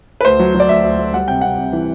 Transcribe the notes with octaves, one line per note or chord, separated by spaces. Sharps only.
B4
D2 C5
F#3
F#3
D5
D2 E5
D2
D2
G3 F#5
C3 G5
C3 F#5
C3
E3